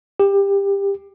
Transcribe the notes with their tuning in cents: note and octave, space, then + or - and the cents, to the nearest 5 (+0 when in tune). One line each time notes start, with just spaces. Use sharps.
G4 +20